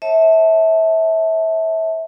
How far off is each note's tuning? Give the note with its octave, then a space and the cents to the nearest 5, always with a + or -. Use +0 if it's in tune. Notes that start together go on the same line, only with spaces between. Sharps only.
C#5 -25 E5 -25 A5 -5